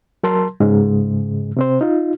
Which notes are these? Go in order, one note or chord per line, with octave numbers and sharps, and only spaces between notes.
F#3 A#4 A5 C6
G#2 C#3 G#3
C3 C4 C5
D#4 F4